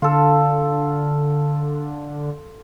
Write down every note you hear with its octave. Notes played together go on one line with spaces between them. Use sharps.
D3 F4 A4